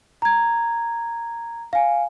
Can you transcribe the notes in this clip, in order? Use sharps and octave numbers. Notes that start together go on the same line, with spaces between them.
A#5 G#6
F5 G#5